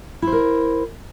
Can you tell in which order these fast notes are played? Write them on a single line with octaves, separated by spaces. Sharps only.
E4 C5 A#4